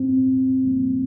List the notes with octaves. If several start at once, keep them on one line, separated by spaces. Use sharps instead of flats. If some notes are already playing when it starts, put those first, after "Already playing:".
Already playing: C4